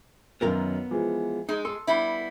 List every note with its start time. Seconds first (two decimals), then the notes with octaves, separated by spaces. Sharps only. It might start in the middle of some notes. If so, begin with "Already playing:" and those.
0.41 F#2 D#3 F#3 B3 A#4 F5
0.91 E3 F3 G#3
1.49 G#3 D#4
1.65 A4 C6
1.87 G3 B3 E4